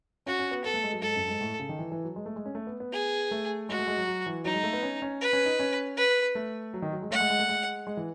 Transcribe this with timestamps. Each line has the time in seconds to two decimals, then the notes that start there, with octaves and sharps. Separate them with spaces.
0.26 C#4 F#4
0.39 C#4
0.51 B3
0.64 B3 A4
0.74 A3
0.84 G#3
0.93 F#3
1.02 G#2 A4
1.16 F#2
1.28 G#2
1.41 A2
1.60 C#3
1.69 D#3
1.79 E3
1.92 E3
2.04 F#3
2.16 G#3
2.26 A3
2.36 G#3
2.46 C#4
2.55 A3
2.67 B3
2.80 B3
2.93 G#4
3.31 A3
3.69 G#3 F#4
3.79 A3
3.88 G#3
3.97 F#3
4.07 F#3
4.26 E3
4.45 F#3 D#4
4.54 G#3
4.63 A3
4.73 B3
4.83 C#4
5.02 C#4
5.21 B4
5.33 C#4
5.46 D#4
5.60 C#4
5.97 B4
6.35 A3
6.74 F#3
6.82 D#3
6.92 F#3
7.02 G#3
7.11 A3 F#5
7.20 G#3
7.30 G#3
7.39 A3
7.49 G#3
7.87 G#3
7.97 E3